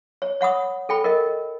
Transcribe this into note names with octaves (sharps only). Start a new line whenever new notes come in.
C#5
C#5 F#5 B5 D#6
A4 G5 B5
A#4 D#5